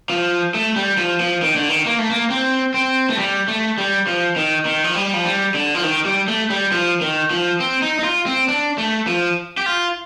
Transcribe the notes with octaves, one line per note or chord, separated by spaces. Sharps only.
F3
A3
G3
F3
F3
D#3
D3
D#3
A#3
A3
A#3
C4
C4
A3
G3
A3
G3
F3
D#3
D#3
F3
G3
F3
G3
D3
F3
D#3
G3
A3
G3
F3
D#3
F3
C4
D#4
D#4
F4
C4
D4
A3
F3
G4
F4